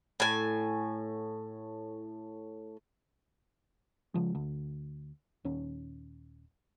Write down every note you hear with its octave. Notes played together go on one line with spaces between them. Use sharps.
A2 G#5
C#3 F3 G#3
D2
D#1 D#2 C#4